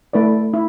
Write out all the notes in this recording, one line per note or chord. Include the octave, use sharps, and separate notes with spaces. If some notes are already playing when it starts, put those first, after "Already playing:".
A3 E4 B4 D5
E4